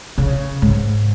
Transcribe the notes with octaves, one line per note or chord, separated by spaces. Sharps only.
C#3
G#2